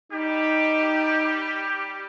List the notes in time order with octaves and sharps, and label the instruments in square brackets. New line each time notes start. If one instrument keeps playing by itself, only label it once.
[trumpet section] G3 G4 [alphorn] D#4